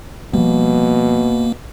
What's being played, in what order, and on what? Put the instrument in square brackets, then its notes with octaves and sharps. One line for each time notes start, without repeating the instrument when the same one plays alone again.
[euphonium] B2 [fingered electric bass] F3 G3 [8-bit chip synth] A#3